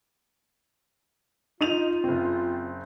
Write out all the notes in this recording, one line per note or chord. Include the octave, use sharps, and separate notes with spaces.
D#4 F4 D#7 F7
F#1 C4